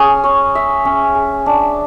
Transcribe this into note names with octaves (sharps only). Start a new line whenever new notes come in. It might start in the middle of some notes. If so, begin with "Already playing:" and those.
Already playing: C#4 G#4
C#5
E5
C#4
G#4
D4